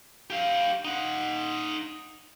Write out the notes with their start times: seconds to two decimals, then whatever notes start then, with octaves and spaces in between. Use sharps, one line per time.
0.30 G4 F5
0.85 D#4 F#5